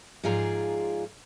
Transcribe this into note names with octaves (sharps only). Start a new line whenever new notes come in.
G#2 F3 F4 G#4 D5 A#5